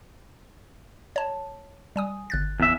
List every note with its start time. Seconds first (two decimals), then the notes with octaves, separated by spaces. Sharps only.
1.16 C#5 A5
1.96 G3 G#5 D#6
2.30 G1 F#6 A6
2.60 E2 E5